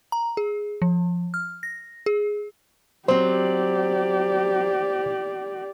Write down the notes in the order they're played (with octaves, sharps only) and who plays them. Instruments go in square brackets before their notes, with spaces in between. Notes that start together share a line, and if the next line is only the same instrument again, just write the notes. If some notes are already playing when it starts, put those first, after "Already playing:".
[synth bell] A#5
G#4
F3
F6
A#6
G#4
[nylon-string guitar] F#3 C4 [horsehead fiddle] G4 D5 [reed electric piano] C5